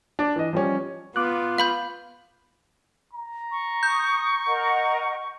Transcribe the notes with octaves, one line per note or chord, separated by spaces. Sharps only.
D4
E3 D#5
F3 G3 C#4
B3 F4 D6 F#6
F5 B5 G6
A#5
C#6
D#6 G6
A#4 D#5 F#5